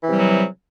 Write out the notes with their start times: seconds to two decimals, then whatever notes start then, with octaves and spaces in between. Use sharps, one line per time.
0.03 E3
0.06 C3
0.10 G3
0.13 F#3